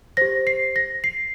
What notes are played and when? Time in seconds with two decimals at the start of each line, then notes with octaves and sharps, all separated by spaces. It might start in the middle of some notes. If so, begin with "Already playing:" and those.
0.17 G4 C5 A#6
0.47 C7
0.76 A#6
1.04 C7